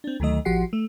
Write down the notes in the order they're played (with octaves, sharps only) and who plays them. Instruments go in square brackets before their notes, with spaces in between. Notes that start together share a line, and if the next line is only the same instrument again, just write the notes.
[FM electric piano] C4 D4
D2 D#3 F#3 A3 D#5
A1 F3 F#4 G4 F#5 C7
A3